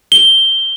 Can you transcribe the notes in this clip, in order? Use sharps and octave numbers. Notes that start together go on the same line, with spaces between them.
G7